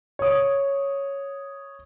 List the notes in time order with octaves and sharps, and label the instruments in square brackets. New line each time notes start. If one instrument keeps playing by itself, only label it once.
[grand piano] C#5 D#6